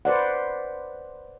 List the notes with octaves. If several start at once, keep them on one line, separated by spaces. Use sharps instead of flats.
B4 C5 D5 F#5